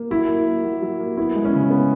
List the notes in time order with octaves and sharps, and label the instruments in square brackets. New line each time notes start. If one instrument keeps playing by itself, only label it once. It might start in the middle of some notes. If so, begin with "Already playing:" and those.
Already playing: [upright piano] A#3
[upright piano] F#3 [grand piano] E4
[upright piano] A#3
A#3
F#3
F#3
A#3
[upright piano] B3 [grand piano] E4
[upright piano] G#3
[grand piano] C#4
[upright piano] C#3
B3